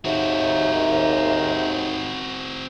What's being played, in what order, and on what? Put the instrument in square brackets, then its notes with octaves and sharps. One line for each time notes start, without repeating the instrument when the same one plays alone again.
[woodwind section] D#2 G#2 D#4 [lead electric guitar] C4 F#4 [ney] E5